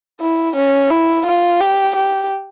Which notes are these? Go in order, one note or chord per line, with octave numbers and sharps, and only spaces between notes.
E4
C#4
E4
F4
G4
G4